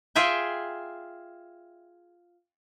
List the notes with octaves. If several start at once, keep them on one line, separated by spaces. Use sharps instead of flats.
F4 G#4 E5 G5